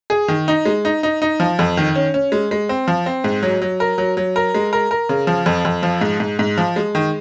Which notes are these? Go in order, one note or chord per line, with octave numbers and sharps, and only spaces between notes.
G#4
D#3
D#4
G#3
D#4
D#4
D#4
F3
F2
D#3
C#4
C#4
G#3
G#3
C4
F3
C4
G#2
F#3
F#3
A#4
F#3
F#3
A#4
G#3
A#4
A#4
C#3
F3
F2
F2
F3
G#2
G#2
G#2
F3
G#3
D#3